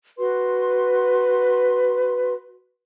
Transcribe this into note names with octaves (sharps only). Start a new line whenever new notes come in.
F#4 B4 C6